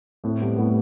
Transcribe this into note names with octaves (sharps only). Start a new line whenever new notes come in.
A2 A3 C4
G3 B3
A2 G3 B3